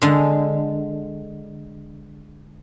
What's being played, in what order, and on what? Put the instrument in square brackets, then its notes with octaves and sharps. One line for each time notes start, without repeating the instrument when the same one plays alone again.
[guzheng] D3 G#3